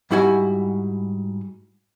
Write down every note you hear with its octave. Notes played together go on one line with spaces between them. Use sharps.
G#2 G3 E4 F#4 G#5